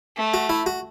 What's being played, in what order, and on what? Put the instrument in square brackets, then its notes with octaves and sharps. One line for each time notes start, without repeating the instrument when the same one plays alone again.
[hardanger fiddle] A3
[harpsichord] F#4
E4
F#4